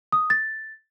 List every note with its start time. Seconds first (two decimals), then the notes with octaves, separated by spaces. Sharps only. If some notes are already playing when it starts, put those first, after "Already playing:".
0.12 D#6
0.30 A6